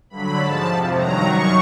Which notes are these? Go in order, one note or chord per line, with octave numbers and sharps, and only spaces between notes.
G2 D3 F#3 B5
G#2 F3 A5
F2 C3 F3
G2 D#3 F#3 A#5
F#2 D#3 F#3 C#6